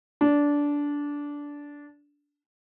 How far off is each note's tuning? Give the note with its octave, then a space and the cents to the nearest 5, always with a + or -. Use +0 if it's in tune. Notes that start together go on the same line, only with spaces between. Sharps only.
D4 -15